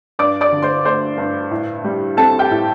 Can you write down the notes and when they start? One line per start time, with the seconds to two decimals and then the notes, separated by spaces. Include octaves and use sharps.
0.19 G2 D5 D6
0.41 D5 D6
0.52 D3
0.62 C5 C6
0.84 A3 C5 C6
1.18 G2
1.51 A2
1.84 G3
2.17 C4 A4 A5
2.39 G4 G5
2.51 A2